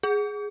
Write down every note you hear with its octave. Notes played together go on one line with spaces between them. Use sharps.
G#4